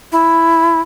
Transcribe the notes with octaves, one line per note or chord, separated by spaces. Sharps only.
E4